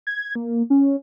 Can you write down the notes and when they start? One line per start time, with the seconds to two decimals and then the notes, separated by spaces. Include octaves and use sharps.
0.07 G#6
0.35 A#3
0.70 C#4